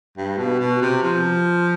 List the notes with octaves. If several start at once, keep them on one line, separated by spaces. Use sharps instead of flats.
G2
B2
B2
C3
F3